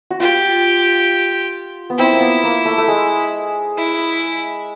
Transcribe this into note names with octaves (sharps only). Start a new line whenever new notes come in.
F#4
F4 G4
B3
C4 E4
A#3
B3
A#3
A3
A3
G#3
E4